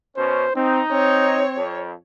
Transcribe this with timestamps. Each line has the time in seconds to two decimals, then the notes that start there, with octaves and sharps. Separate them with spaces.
0.17 B2 C#4 C5
0.56 C4 D#4
0.92 C4 C#5
1.57 F2